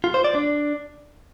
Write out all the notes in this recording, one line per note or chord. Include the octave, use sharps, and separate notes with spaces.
F4
C5
D5
D4